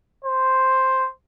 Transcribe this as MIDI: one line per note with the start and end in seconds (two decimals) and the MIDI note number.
0.25 1.07 72